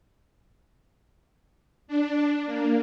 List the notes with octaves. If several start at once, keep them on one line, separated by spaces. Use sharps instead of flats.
D4
A#3